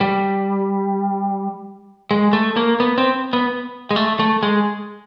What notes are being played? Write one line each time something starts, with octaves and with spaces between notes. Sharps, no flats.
G3
G#3
A3
A#3
B3
C4
B3
G#3
A3
A3
G#3